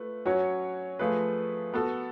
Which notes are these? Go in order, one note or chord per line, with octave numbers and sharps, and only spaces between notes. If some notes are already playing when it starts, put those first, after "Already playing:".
Already playing: A3 F4 B4
F#3 C#4 F#4 C#5
F3 A3 F4 G#4 B4
B3 F#4 A4